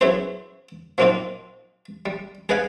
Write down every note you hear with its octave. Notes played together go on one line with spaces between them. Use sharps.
F#3 B3 C#4 E4 G#4 C5
F3 F#3 A#3 C4 D#4 F4
G3
G#4 B4 D#5 F5 F#5 G#5